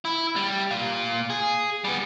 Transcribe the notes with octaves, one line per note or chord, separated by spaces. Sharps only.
E4
G3
A#2 F5
G#4
G3 B3